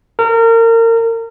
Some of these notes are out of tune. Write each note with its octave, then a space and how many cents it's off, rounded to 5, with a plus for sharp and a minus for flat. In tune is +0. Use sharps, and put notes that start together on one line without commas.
A#4 -30